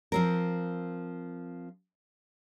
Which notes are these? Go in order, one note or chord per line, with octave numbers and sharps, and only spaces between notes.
F3 C4 A#4